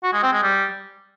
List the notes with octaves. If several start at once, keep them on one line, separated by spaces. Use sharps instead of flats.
F#4
G#3
C4
G#3
G3